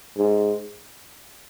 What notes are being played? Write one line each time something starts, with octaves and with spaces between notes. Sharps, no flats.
G#2